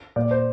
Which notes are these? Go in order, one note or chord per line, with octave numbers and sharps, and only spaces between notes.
A#2 D5
C5